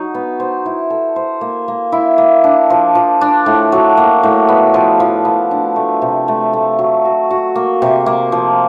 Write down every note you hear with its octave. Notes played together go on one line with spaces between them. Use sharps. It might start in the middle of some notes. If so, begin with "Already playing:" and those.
Already playing: F#3 D#4
B3
C5
E4
A4
C5
A#3
A#3
E4
A#3
D4
F3
F3
D4
A2
F#3
A#3
A2
B3
F3
F3
B3
D4
A3
C3
A3
A3
F#3
F#4
F#4
A#3
C3
A#3
F3